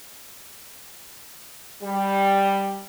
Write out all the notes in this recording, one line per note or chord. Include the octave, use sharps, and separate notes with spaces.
G3